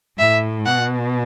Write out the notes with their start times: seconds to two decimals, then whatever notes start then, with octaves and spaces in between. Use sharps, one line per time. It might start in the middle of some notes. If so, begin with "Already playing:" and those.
0.18 A2 E5
0.66 B2 F#5